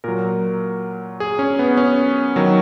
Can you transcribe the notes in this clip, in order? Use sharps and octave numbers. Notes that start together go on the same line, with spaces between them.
A#2 F#3 A#4
G#4
C#4
B3
C#4
D#3 F#3